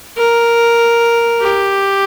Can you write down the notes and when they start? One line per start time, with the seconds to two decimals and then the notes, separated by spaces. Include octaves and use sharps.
0.17 A#4
1.41 G4